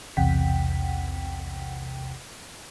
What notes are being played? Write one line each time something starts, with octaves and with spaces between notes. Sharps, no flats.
B1 E2 C3 F#5 G5 B6